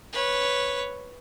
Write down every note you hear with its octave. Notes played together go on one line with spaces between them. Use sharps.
B4 C#5